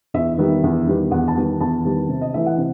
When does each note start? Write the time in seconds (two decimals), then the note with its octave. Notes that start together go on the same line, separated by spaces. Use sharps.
0.14 E2 E5
0.38 D#3 G3 B3
0.64 E2
0.87 D#3 G3 B3
1.11 E2 F#5
1.28 A5
1.37 D#3 G3 B3
1.61 E2 A5
1.85 D#3 G3 B3
2.09 C3
2.21 D#5
2.34 E3 A3 E5
2.46 F#5
2.58 C3